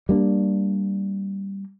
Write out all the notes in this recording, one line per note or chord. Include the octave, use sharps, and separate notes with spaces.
G3 A#3 D4